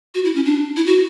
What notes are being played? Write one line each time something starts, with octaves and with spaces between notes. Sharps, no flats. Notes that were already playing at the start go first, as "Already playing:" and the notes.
F#4
E4
C#4
D4
E4
F#4